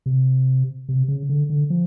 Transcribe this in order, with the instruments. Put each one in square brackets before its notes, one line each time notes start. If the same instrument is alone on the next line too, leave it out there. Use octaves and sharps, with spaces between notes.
[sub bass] C3
C3
C#3
D3
D3
F3